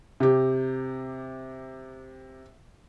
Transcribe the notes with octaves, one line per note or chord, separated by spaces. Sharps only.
C3 G4